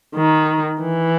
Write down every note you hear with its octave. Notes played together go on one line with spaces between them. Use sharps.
D#3
E3